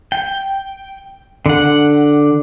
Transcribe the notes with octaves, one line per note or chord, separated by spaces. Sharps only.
G5
D3 F#5